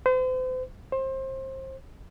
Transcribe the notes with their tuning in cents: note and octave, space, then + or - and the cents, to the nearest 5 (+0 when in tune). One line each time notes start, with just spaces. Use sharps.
C5 -40
C5 +25